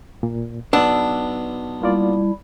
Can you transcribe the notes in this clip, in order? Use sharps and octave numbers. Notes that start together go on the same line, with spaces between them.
A#2
B1 B3 D4 E6
G3 A#3 E4 F4 D5